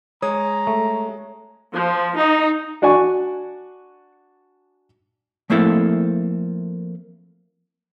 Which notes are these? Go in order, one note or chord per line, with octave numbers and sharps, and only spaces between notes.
G#3 C#5 A#5 D#6
A3
F3
D#4
D4 F#4 D5 G#5 C#6
F3 A3 A#3 C4 E4 A4